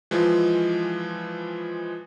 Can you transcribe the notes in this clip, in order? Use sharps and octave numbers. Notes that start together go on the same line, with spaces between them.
E3 F3 G#3 F4